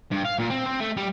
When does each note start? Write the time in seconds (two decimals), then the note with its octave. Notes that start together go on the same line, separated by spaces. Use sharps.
0.12 G2
0.25 F5
0.39 A#2
0.50 C4
0.66 C4
0.80 A3
0.97 G3